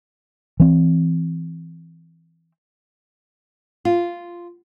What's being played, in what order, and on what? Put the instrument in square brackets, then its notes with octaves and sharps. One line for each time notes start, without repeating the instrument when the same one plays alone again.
[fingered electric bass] E3 C4
[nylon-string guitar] F4